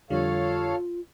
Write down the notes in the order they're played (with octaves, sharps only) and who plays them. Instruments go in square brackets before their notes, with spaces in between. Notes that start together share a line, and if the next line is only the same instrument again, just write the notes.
[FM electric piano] F2 D3 G3 [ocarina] F4 [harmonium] A4 C#5 F5